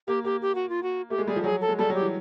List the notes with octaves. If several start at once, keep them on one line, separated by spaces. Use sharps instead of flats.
A#3 G4
A#3 G4
G4
F#4
F4
F#4
A3 G4
G#3
G3 G#4
F3
F#3 G#4
A4
G#3
G3 A4
F#3
G4
E3